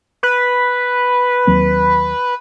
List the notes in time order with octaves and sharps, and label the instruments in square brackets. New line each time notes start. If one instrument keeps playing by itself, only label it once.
[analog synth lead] B4
[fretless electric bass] D#2 F#3 C4